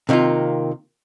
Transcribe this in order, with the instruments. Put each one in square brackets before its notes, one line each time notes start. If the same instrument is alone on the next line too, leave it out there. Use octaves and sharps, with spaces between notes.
[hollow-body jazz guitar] C3 D#3 A#3 F4